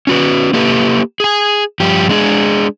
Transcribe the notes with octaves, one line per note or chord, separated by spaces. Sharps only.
C#4 F#4 B4
A#3 G4 A4 B4
G#4 G#5
G2 F3 G4
G#3 D4 G#4